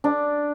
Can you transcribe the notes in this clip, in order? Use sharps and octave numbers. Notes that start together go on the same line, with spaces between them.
D4